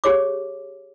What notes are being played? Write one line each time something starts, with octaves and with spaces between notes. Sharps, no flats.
G4 G#4 C#5 D6